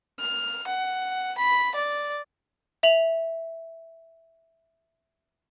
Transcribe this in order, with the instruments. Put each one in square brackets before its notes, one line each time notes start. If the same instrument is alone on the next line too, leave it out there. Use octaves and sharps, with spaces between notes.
[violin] F6
F#5
B5
D5
[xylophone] E5 F7 F#7